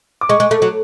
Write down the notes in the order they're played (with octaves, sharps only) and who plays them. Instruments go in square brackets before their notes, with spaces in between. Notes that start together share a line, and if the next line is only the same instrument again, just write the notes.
[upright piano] D6
[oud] G#3 [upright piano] C#6
[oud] G#3
A3
F#3